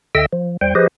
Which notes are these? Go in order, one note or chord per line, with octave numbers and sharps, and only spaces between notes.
D2 D3 D#5 E5 G5 E6
F3
E2 G3 C5 G5
F3 G4 G#4 B4 C5 D#5